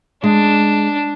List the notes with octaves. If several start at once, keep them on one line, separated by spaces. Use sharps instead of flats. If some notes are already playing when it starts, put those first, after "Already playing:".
G#3 D4